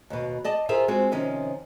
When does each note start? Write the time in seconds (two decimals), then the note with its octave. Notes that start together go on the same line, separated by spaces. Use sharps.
0.10 D#2 B2
0.44 D5 D#5 A5
0.69 F4 G#4 A#4 C5 E5
0.88 G#3 C4 F4 F#4
1.12 C3 D#3 F3 C#4